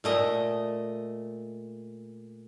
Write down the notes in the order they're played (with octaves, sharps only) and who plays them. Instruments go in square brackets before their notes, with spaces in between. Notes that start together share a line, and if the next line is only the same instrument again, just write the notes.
[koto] A#2 A3 D#5